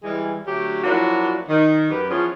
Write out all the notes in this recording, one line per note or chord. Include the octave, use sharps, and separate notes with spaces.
E3 G3 G#3
D3 F#3 A3 G4
F3 F#3 A#3 D4 E4 F#4
D#3
F#2 G4 B4
E3 F3 B3 C#4 F4 G#4